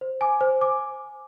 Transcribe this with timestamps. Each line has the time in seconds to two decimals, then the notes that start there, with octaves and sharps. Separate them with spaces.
0.01 C5
0.21 G#5 D6
0.41 C5
0.61 G#5 D6